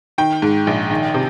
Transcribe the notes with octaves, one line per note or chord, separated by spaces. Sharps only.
D#3 G5
G#2
A#1
D#3
C3